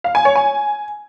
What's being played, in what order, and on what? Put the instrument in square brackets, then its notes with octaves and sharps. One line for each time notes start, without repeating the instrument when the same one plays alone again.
[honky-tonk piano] F5
G#5
C#5
G#5